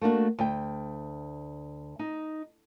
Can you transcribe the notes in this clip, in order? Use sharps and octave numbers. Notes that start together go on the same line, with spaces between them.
A3 A#3 D4 F#4
D2 G5
D#4